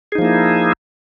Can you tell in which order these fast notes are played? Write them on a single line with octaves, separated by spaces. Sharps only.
G#4 D#4 F3 A#3 E4